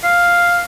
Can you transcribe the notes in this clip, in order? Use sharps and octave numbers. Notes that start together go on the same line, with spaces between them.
F5